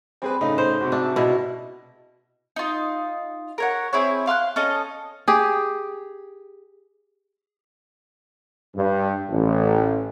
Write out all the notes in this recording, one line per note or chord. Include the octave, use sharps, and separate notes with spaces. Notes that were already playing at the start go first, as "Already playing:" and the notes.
G3 C4 G#4 B4
A2 C#3 D#4
C5
G#2 C3 F#4
D4 E5
B2 E4
D#4 F4
A#4 C#5 F#5
C4 E4 G#4 C#5
F5 C6 E6 F#6
C#4 A4 D#5
G4 G#4
G2
A1